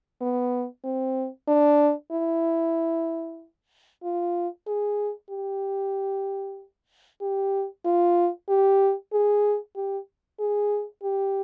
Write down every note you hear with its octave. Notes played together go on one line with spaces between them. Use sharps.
B3
C4
D4
E4
F4
G#4
G4
G4
F4
G4
G#4
G4
G#4
G4